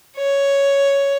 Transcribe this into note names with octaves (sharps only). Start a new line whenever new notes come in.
C#5